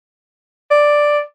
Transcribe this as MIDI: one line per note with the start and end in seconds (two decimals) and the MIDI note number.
0.71 1.21 74